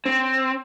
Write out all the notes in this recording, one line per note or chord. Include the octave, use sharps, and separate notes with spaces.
C4